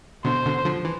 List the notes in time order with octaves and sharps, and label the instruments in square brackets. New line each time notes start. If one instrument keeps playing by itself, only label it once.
[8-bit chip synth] B2 D3 [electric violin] C5
[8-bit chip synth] B2 D3
D3 F3
E3